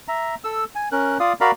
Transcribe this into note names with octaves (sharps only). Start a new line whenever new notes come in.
E5 A#5
A4 E6
G#5
C#4 A#4 F#6
F4 D5 F5 D#6
F#4 A#4 D5 F5 A#5 B5